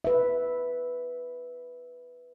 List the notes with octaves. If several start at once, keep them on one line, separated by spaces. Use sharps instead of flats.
B4 E5